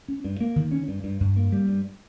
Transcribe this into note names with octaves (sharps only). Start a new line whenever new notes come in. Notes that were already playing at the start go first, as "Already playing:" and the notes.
C#4
G2
A#3
D#3
C#4
G2
G2
G2
A#3
G3
G2